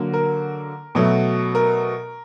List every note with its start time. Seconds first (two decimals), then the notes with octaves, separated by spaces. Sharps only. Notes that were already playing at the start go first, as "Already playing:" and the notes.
Already playing: D3 F#3 A#3
0.13 A#4
0.95 B2 F#3 A3
1.55 A#4